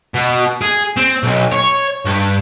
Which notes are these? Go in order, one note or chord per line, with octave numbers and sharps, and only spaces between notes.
B2
G#4
C4
B1
C#5
G2